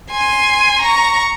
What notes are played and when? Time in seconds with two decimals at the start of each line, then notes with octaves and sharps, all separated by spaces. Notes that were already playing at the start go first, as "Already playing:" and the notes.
0.11 G#5 C6
0.81 A#5 C#6